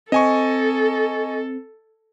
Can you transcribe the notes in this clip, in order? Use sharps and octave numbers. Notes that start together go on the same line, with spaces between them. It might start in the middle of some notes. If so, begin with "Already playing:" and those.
C4 A4 D#5 G#5 C#6